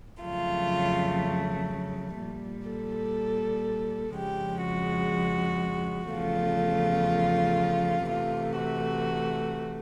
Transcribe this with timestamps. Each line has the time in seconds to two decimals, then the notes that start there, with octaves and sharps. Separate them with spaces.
0.22 F2 C#3 F#3 A3 F4
2.20 A#2 G3
2.68 A4
4.16 F2 C#3 F3 G#3 G4
4.65 F#4
6.12 E2 C#3 F3 A3 F4
8.09 C3 E3 A3 F4
8.58 F#4